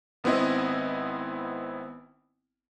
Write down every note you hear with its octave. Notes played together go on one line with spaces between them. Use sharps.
G#1 B3 C4 E4 D#5